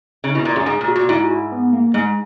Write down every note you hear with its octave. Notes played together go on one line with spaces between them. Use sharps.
C#3 D#4
B2 E4
A#2
F#2 G#4
G#2 G#4
A#2
F#4
A#2
G#2 E4
F#4
E4
B3
A#3
G#2 G#3